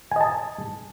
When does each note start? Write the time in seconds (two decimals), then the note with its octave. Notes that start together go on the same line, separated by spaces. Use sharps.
0.11 G#5
0.16 D#5
0.21 A5